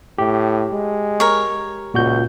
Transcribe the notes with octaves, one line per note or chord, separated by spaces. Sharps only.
A2 G4
G#3
A#4 C#5
C#2 A#2 F#4 G6